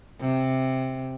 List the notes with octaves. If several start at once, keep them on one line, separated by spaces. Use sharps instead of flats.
C3